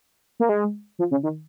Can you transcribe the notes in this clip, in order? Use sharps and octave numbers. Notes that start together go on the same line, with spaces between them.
A#3
G#3
F3
C#3
D#3